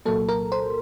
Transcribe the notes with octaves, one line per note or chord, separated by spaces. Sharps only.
C2 A#2 F#3 A#3 A4
A#4
C5